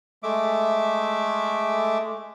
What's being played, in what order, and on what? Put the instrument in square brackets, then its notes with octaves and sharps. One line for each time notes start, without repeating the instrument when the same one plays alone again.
[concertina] G#3 A3 E5 D6